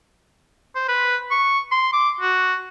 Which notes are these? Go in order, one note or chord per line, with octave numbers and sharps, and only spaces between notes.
C5
B4
C#6
C6
D6
F#4